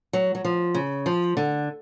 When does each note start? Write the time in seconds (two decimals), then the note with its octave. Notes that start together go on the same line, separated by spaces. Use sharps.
0.13 F#3
0.35 F#3
0.45 F3
0.75 C#3
1.06 F3
1.37 D3